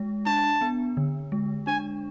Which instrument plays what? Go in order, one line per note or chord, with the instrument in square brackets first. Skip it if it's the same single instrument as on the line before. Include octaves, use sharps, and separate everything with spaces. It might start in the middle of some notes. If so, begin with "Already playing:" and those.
Already playing: [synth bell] G#3
[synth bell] D4 [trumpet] A5
[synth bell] B3
D3
G#3
[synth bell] D4 [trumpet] G#5